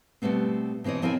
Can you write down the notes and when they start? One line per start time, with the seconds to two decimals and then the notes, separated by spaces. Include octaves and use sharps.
0.22 B2 G3 A3 B3 C4
0.84 B2 E3 C4 C#5 D#5
1.02 F3 C4 E4 A#4 G#5